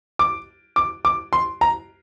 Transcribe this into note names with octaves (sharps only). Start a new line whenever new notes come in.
D6
D6
D6
C6
A#5